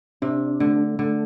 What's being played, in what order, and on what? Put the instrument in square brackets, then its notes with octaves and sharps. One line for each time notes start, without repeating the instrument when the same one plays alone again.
[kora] C3 [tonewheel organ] D4
[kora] D3 [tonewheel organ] A3
[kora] D3 [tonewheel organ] A3